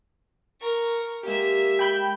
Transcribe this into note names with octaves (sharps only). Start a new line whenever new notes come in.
A#4 C#6
G#3 A#3 G4 E5
G5 B5 G6